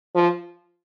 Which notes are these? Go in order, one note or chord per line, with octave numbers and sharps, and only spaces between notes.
F3